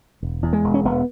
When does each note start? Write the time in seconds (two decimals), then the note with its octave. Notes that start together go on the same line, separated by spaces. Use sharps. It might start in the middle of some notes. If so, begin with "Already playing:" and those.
0.23 E1
0.43 E2
0.53 G#3
0.64 E1
0.74 C#4
0.85 E1 B3